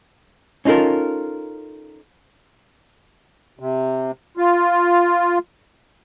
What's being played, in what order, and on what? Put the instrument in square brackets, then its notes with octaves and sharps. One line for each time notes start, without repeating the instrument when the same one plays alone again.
[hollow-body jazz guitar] C#4 D#4 F4 A4 A#4
[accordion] C3
F4